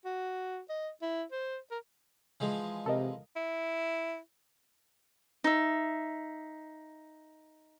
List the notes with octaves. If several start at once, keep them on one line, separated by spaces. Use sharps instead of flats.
F#4
D#5
E4
C5
A#4
E3 F3 G#3
C3 A4 A#4 D#5
E4
D#4 E5